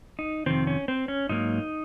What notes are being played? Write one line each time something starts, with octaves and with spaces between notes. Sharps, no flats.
D#4
F2 C3 D#3 C4
C#4
C4
C#4
G#2 F#3 A#3 D#4